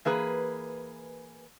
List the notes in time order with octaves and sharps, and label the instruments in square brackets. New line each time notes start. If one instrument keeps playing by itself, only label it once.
[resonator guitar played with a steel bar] E3 A#3 G#4 B4